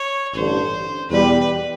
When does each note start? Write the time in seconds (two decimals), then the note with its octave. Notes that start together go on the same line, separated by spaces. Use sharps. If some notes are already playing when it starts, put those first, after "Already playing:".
Already playing: C#5
0.34 A1 G2 D3 C5
1.10 E2 B2 G3 B4